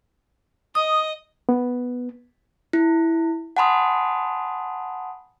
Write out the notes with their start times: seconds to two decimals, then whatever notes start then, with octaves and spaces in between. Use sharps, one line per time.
0.75 D#5 D#6
1.49 B3
2.73 E4
3.57 F#5 G#5 A5 B5 C6 D#6